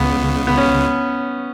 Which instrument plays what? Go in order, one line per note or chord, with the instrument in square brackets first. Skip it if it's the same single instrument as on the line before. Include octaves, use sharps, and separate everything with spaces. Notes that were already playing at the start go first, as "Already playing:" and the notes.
Already playing: [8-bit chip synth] C#2 C#3 [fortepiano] B3
[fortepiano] B3
C#4